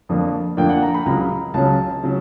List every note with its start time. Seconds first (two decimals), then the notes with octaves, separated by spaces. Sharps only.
0.09 F2 D3 F3 A#3 D4
0.57 F2 D3 F3 A#3 D4 G5
0.69 F#5
0.82 A#5
0.94 B5
1.06 C#2 C#3 F#3 A#5
1.54 C#2 C#3 F#3 A5
2.04 C#3 F#3